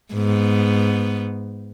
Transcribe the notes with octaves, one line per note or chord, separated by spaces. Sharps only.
G#2 B3